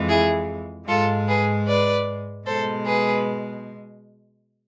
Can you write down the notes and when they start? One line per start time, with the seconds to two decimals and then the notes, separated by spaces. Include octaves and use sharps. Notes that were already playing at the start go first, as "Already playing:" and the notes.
Already playing: F2 E3 G#3
0.09 E4 G#4
0.88 G#2 G#3 F4 A4
1.28 G#4 B4
1.67 B4 D5
2.46 B2 G#3 A4 C5
2.86 G#4 B4